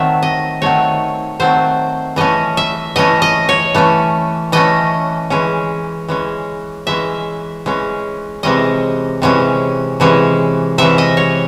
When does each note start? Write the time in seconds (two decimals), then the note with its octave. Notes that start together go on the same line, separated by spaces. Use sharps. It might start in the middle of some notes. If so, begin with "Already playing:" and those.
Already playing: D#3 F#3 A3 C4 E5
0.23 D#5
0.62 D#3 F#3 A3 C4 C#5
1.39 D#3 F#3 A3 C4 C5
2.16 E3 A3 C#4 D#5
2.57 E5
2.96 E3 A3 C#4 D#5
3.22 D#5
3.49 C#5
3.75 E3 A3 C#4
4.52 E3 A3 C#4 D#5
5.30 E3 G#3 C#4
6.08 E3 G#3 C#4
6.87 E3 G#3 C#4 E5
7.66 E3 G#3 C#4
8.43 C3 E3 G#3 C#4 D#5
9.22 C3 E3 G#3 C#4
10.00 C3 E3 G#3 C#4
10.78 C3 E3 G#3 C#4 E5
10.98 D#5
11.17 C#5